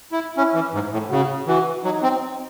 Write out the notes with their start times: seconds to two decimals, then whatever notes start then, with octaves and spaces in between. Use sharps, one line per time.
0.12 E4
0.37 C#4 E4
0.55 E3
0.74 G#2
0.93 A2
1.10 C#3 F#4
1.47 E3 F#4
1.84 F#3 D#4
2.03 C4